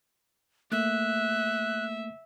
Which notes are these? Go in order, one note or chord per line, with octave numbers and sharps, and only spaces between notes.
A3 A#3 E5 F#6